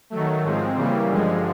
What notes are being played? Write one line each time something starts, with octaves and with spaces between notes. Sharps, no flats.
D#3 F#3 A3
G#2 F3 G#3 C4
C#3 E3 G3 A#3
G2 D3 F3 G#3